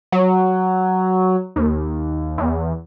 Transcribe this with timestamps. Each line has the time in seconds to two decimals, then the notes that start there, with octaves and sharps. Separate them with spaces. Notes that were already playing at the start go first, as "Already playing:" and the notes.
0.12 F#3
1.56 D#2
2.38 E2